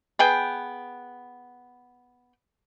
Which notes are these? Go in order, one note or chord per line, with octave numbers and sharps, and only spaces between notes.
B3 G#4 G5